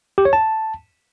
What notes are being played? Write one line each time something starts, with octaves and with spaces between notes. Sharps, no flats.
G4
C#5
A5